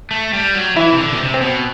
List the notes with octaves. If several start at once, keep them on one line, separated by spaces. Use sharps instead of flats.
A3
G3
F#3
E3 E4
C3
D3
B2
C3
C4
B2